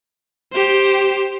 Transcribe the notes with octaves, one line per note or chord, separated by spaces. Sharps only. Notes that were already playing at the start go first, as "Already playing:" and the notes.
G4 C5